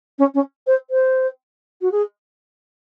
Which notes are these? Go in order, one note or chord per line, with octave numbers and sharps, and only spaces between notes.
C#4
C#4
C5
C5
F#4
G#4